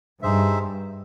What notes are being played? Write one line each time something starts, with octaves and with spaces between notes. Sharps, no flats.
G2 D#4 G#4 C5 E5